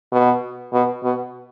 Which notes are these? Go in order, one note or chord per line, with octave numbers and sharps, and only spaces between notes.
B2
B2
B2